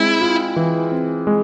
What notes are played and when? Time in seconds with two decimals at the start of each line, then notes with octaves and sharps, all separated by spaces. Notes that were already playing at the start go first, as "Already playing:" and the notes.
Already playing: G#3 C4 E4
0.21 F4
0.56 E3
0.92 C4
1.27 G#3